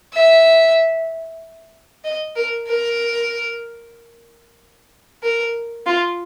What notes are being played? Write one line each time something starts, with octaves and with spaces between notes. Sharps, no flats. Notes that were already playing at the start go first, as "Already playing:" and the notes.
E5
D#5
A#4
A#4
A#4
F4